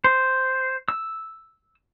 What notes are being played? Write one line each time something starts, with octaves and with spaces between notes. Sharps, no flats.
C5
E6